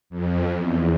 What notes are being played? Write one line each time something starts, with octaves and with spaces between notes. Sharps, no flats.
F2
E2